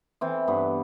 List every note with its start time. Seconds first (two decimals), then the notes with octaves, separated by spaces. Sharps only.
0.21 E3 C4
0.48 G2 B3